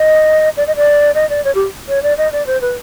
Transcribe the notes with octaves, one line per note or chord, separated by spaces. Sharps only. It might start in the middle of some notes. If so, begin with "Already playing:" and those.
Already playing: D#5
D5
D#5
D5
D#5
D5
C#5
G4
C#5
D5
D#5
D5
C5
B4